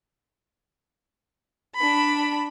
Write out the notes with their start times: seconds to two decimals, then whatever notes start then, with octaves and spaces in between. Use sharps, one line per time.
1.75 D4 B5